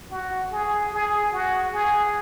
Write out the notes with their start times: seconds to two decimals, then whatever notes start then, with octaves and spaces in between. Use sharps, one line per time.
0.11 F#4
0.52 G#4
0.92 G#4
1.33 F#4
1.73 G#4